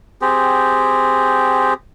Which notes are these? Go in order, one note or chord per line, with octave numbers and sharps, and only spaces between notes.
C4 G4 G#4